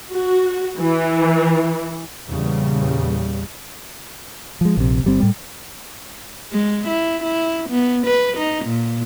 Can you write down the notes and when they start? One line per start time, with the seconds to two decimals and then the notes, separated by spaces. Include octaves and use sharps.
0.11 F#4
0.79 E3
2.29 E2 A#2 C#3 G3
4.61 F3 G#3
4.77 A#1 C3
5.04 G1 G3 C4
5.20 A2 G3
6.52 G#3
6.87 E4
7.23 E4
7.69 B3
8.06 B4
8.37 D#4
8.65 A#2